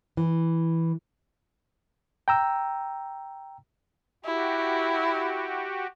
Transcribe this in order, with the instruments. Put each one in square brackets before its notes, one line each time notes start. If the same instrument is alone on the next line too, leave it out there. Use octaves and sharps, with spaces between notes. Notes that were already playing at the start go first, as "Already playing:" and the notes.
[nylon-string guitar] E3
[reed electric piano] G5 A#5 E6
[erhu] E4 [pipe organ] F#4 G4